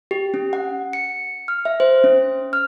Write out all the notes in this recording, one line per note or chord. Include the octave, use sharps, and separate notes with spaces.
G4
C#4
F#5
C#7
F6
E5
C5
C#4
F6